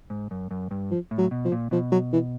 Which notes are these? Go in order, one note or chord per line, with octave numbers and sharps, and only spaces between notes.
G#2
F#2
F#2
G2
F3
A2
F#3
B2
F3
A#2
B2 F3
F#3
E3